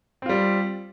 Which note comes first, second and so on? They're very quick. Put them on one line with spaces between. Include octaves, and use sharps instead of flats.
C4 F4 G3